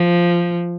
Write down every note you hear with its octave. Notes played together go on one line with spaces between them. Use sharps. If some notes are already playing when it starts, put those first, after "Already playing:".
Already playing: F3